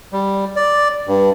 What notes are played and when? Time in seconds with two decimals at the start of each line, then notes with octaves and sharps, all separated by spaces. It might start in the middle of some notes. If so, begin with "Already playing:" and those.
0.12 G3
0.56 D5
1.07 G2